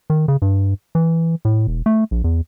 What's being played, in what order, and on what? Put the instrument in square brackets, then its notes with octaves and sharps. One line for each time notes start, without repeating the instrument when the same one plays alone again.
[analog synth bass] D#3
C#3
G2
E3
A2
E1
A3
A#1
E2